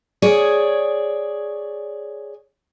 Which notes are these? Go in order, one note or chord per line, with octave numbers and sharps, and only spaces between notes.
G#4 C#5 D5